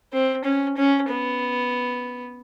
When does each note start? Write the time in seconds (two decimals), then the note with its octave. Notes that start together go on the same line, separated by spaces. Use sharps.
0.13 C4
0.45 C#4
0.77 C#4
1.10 B3